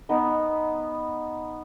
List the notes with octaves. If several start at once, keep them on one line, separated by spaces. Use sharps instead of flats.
B3 D#4